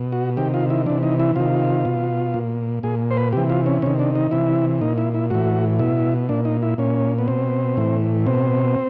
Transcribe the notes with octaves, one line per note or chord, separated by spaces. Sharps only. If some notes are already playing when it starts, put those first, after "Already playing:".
Already playing: B2
F#4
C3 D#3 G4
F4
E4
C3 E3 D4
D#4
E4
C3 D#3 F4
B2
A#2
A#2 G#4
C5
B4
C3 E3 G4
F4
C#4
C3 D#3 C#4
D4
D#4
C3 E3 E4
A#2 D#4
E4
E4
A2 E3 F#4
B2 E4
A#2 D4
D#4
E4
A#2 C#4
B3
B2 C4
A2 E3
B2 C4